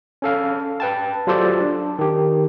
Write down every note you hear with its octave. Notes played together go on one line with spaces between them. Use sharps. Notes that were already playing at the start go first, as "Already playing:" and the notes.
C#4 A4 F5
B4 G5 A5
F#3 F4 G4 A4 C5 D5
D4
D#3 G4